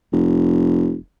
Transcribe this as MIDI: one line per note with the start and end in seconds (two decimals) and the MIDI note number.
0.13 0.97 29